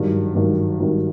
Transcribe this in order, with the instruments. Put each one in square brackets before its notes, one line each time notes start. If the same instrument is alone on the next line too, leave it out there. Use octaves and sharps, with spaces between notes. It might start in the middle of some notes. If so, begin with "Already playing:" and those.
Already playing: [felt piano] G#1 G2 D#3 F#3
G#1 G2 D#3 F#3
G#1 G2 D#3 F#3